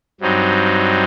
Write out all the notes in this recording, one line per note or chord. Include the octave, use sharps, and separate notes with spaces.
G2 F#3 C4 D#4